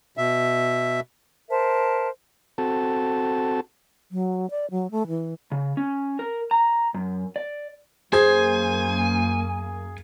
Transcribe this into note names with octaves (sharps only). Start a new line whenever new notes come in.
B2 E5
A#4 C5 E5 A5
C4 F#4 A4 A5
F#3
D5
F#3
A3
E3
C#3
C#4
A#4
A#5
F#2
D5
F#2 A#3 G#4 C5 G#5 G#6